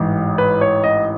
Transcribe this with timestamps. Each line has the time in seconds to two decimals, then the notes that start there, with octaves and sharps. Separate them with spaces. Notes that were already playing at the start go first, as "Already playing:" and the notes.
Already playing: A1 G#2 E3
0.38 B4
0.61 C#5
0.84 D#5